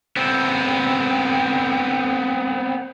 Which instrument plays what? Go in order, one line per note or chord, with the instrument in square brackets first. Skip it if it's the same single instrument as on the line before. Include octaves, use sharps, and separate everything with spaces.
[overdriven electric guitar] B3 C4